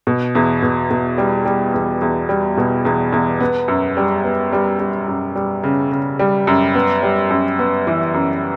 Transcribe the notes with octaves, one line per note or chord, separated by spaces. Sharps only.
B2
E2
B2
B2
G3
G3
E2
E2
G3
B2
E2
E2
B3
F#2
G3
B3
G3
G3
F#2
G3
C#3
C#3
G3
F#2
B3
G3
F#2
B3
E3
F#2